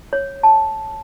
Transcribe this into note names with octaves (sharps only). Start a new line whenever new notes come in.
C#5
A5